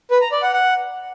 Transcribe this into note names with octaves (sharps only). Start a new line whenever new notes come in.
B4
A#5
D5
F#5
F#5